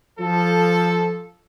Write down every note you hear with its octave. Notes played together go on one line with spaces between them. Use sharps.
F3 A4